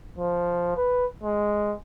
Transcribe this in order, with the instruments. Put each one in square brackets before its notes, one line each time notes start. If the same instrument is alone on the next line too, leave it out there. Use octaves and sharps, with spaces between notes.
[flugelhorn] F3
B4
G#3